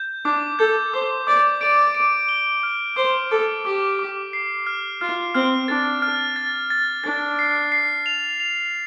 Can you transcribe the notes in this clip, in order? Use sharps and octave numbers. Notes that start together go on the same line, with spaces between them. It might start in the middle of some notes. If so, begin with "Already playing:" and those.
Already playing: G6
D4 D6
A4 G6
C5 D6
D5 D6
D5 D7
D7
G7
F6
C5 D6
A4 D6
G4 D6
D6
C7
F6
F4 F6
C4 F6
D4 A6
F6
A6
A6
D4 A6
C7
C7
F7
F7